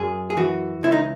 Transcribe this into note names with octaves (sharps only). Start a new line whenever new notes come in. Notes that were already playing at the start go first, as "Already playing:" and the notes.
Already playing: F#2 G#4
G#4
E3 F#4
C#2 E4
D#4